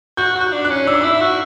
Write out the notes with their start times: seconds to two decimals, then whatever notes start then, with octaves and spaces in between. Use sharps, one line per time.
0.17 F#4 G6
0.35 F#4
0.41 F#6
0.52 D4
0.64 F#6
0.70 C#4
0.87 D4 E6
0.94 D6
1.02 E4 E6
1.21 F#4